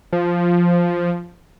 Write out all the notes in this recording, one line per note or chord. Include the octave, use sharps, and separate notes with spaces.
F3